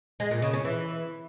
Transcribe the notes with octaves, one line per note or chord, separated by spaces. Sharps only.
G#3
A#2
C#3
C#4
E3